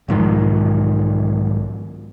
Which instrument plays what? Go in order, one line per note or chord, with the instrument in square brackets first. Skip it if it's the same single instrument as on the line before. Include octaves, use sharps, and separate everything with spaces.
[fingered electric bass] B1 G#2 D#3 F3